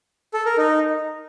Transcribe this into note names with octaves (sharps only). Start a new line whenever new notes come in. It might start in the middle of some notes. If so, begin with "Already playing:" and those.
A4
A#4
D#4